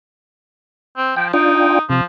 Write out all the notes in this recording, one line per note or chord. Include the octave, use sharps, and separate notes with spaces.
C4
F3 G5
D4 D#4 F4 G5
C3 F3